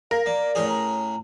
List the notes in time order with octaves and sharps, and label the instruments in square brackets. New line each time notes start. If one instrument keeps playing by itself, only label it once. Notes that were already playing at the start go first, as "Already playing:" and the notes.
[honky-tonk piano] A#4 [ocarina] F5
[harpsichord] A#3 [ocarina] D5
[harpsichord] A2 C#4 G#4
[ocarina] A#5